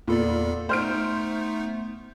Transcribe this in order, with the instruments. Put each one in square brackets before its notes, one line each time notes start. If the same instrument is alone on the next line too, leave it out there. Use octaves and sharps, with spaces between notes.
[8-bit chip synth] E2 A4 D5 [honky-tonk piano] A#2 B3
[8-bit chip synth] A3 B3 D#4 [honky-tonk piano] C5 F6 D7